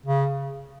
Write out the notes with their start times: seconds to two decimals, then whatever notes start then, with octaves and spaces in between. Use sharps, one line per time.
0.06 C#3